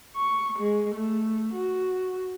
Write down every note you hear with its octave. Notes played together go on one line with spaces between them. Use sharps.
C#6
G#3
A3
F#4